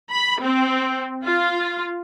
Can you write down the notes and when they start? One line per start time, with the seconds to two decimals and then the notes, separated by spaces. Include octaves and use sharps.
0.11 B5
0.41 C4
1.25 F4